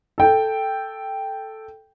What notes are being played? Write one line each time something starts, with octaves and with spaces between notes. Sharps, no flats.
A4 G5